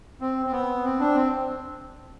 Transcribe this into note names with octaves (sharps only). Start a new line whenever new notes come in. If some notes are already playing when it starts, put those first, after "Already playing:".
C4
C4
B3
C4
D4
C4